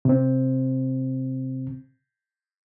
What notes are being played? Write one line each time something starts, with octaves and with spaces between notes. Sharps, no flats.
C3 C4